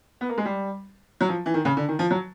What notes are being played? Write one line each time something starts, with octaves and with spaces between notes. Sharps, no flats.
B3
A#3
G#3
G3
F#3
F3
E3
D#3
C#3
D3
D#3
F3
F#3